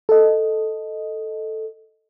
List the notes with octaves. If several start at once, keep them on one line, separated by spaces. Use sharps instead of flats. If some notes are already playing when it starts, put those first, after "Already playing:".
A4 D#5